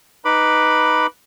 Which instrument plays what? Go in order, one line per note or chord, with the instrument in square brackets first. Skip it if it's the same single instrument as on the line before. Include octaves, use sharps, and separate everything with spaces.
[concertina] D#4 B4 B5 D6